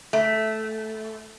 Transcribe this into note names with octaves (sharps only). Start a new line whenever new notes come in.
A3